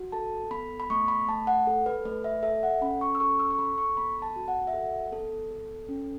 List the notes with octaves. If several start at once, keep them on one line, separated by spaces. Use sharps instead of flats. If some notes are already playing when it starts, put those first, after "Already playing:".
Already playing: F#4
A4 A5
B3 B5
B5
A3 C#6
B5
A3 A5
F#5
A4
B4
A3 B4
E5
A4 E5
F#5
C#4 B5
C#6
E6
A4 C#6
E6
C#6
A4 B5
C#6
B3 B5
A5
F#4
F#5
E5
A4 F#5
B3 A4
A4
C#4